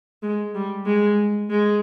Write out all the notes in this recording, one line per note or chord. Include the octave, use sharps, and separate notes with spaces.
G#3
G3
G#3
G#3